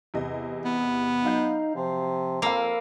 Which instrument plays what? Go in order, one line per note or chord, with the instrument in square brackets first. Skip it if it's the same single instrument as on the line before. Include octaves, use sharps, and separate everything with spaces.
[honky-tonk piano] E2 C3 D#5
[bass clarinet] B3
[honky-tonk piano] F#3 F5 G6 [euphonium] D#4
[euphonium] C3 [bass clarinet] F3
[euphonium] F2 [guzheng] A#3 [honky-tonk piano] F5 B5 E6